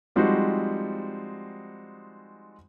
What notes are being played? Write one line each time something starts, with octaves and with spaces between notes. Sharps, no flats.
F3 G3 G#3 C4 D#4 F#4